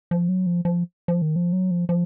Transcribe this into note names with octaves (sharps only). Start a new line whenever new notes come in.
F3
F#3
F3
F3
F3
D#3
F3
F#3
F3
F3